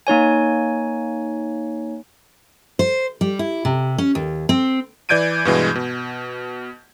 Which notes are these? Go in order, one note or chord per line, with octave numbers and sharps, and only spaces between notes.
A#3 D#4 C#5 G#5
C5
G3
E4
C3
C#4
D#2
C4
E3 D5 G6 G#6 D7 D#7
G2 B2 E3 G#3
B2